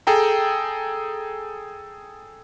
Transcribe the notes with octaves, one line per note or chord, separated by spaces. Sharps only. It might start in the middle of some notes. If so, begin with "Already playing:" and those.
G#4 A4 G5 A#5